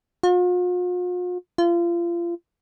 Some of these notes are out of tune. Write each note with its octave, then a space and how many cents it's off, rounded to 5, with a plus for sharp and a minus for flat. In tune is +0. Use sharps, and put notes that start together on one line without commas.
F4 +45
F4 -30